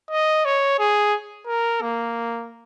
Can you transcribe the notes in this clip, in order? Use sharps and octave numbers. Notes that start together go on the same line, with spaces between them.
D#5
C#5
G#4
A#4
A#3